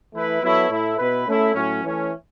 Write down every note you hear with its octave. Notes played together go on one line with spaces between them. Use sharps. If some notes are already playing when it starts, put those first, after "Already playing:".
E3 A3 E4 B4
F#3 B3 E4 A4 C#5
A2 A3 E4
B2 B3 E4 B4
A3 C#4 E4 A4
A2 F#3 C#4
E3 A3 C#4